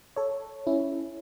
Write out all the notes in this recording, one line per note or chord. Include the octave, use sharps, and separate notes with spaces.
A4 C#5
C#4 E4